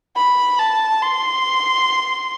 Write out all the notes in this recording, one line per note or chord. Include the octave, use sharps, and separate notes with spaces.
B5
A5
C6